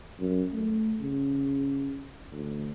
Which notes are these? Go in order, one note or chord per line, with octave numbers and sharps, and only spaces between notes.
F#2
A3
C#3
D2